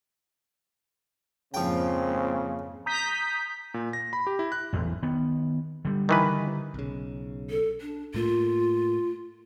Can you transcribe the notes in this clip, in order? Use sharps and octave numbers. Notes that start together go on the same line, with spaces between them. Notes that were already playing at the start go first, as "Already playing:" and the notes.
F2 G#2 C#3 F3 A#3 C4 G5
A#5 D#6 G6 B6
A#2
A#6
B5
G4
E4
F#6
A1 E2
D#3 B3
D3 G3
D#3 E3 B4
B1 C#3
A4
D4
A2 A3 A#3 F4